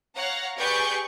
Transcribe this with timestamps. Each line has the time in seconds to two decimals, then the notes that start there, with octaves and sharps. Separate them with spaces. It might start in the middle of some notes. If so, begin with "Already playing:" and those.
0.16 C#5 F5 F#5 A#5
0.57 G4 G#4 B4 D5 C#6 G6